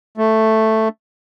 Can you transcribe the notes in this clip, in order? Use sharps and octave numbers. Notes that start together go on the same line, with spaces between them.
A3